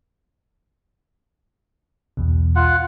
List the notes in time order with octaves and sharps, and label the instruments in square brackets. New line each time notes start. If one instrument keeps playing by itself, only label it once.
[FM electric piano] B1 E2 B2
[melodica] F4 F#5